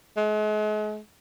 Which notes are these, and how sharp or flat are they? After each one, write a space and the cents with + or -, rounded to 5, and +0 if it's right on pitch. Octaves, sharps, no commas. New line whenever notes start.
G#3 +40